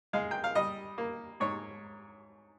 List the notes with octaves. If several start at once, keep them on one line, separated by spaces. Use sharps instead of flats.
G#3 F5
G5
F5
G3 D#5
A#3
G#2 C#5